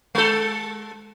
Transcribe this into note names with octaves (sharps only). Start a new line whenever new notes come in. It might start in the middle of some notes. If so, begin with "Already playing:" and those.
G#3 A4